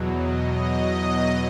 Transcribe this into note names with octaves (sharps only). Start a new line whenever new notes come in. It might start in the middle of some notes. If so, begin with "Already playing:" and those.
Already playing: E2 B2 F#3
D#5
D#5